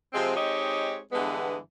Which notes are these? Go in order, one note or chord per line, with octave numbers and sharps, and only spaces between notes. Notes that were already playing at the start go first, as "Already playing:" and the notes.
C3 F3 G#3 C4
G#3 C4 D#4 G4 C#5 D#5
G2 D3 E3 G#3 B3